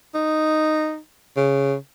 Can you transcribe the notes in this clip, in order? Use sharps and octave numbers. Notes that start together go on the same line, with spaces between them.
D#4
C#3